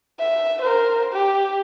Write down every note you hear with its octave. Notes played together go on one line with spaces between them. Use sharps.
E5
A#4 C5
G4